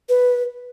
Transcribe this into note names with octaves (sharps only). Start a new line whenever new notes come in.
B4